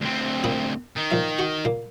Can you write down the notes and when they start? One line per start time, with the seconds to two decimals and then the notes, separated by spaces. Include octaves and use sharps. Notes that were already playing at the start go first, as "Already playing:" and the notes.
0.01 D2 C4
0.44 A#2 B5 D#6
0.96 D#3
1.11 A#2 F3 E5
1.39 F#4 C#6
1.65 A#2 A#3